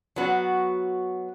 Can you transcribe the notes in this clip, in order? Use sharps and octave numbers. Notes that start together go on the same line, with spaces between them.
F#3 B3 F#4